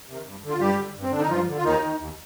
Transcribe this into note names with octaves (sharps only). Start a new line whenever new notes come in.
C3 D#3
G2
D3
F4
G2 G3 G4
D3
G2
C4
D3 D4
D#4
G2 F3 F4
D3
F4
D#2 D#3 D#4
D#3
D#2